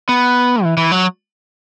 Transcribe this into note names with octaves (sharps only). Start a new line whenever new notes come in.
B3
E3
E3
F#3